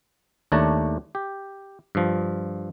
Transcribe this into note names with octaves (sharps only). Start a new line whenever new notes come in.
D#2 A3 D4 C#5 A5 A#5
G4
G2 F3